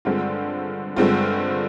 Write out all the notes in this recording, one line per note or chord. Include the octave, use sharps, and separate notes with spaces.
G2 D3 G#3 C4 F4
G2 D3 G#3 C4 F4